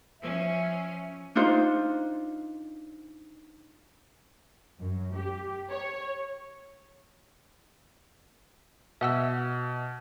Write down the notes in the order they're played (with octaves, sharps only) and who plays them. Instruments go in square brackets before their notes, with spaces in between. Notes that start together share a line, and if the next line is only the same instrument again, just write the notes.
[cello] F3 C#4 [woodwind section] E5
[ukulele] D4 D#4 F4 C5
[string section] F#2
G4
C#5
[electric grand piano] B2 [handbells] E5 F#5 E6